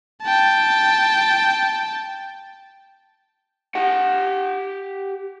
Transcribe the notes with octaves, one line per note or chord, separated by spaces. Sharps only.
G5 A5
G4 F#5